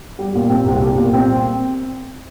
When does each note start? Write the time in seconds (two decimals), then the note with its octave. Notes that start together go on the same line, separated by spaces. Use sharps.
0.19 G3
0.35 A#2
0.50 C4
0.66 C2
0.81 G3
0.97 A#2
1.13 C4